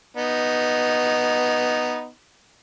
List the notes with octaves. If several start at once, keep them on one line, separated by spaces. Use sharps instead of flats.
B3 D#4